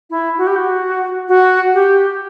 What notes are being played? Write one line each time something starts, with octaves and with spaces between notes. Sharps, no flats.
E4
F#4
G4
F#4
F#4
G4